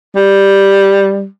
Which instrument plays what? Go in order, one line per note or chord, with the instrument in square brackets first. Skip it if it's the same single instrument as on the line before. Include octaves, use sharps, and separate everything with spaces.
[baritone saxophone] G3